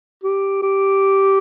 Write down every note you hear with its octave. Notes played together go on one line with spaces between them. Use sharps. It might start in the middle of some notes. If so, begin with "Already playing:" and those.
G4
G4